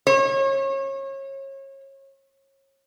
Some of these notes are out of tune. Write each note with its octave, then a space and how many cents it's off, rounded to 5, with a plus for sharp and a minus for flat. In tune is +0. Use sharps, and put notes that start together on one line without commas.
C#5 -30